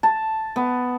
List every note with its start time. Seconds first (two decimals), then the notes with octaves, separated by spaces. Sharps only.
0.03 A5
0.56 B3